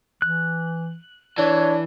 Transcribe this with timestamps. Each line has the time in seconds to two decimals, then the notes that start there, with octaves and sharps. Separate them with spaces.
0.22 E3 F#6
1.38 E3 D4 C#5